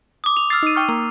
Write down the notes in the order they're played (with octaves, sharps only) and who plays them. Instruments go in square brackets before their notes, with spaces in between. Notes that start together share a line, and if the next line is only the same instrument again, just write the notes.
[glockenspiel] D6 D#6
F7
[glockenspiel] E6 C7 [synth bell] F6 A6
[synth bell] D#4 D#7
G5 C#6 F6
A#3